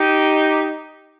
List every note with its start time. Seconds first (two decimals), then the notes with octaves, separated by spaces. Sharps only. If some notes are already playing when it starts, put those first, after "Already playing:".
Already playing: D#4 G4